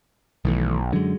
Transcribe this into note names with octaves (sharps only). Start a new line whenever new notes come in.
B1 D#3 E3 A3
F#2 D3 F#3 G#3